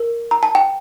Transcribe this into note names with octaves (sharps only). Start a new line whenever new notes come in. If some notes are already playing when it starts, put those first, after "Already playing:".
Already playing: A#4
A#5
A5
G5